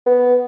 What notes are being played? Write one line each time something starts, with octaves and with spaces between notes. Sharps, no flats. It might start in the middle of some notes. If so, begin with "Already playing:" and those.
B3